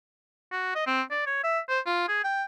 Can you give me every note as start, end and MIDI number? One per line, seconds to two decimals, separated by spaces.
0.52 0.74 66
0.75 0.83 75
0.87 1.02 60
1.11 1.24 74
1.26 1.41 73
1.44 1.60 76
1.69 1.80 72
1.86 2.05 65
2.08 2.21 68
2.24 2.45 79